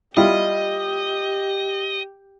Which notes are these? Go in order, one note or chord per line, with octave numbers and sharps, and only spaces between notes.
G3 E4 F4 G4 D#5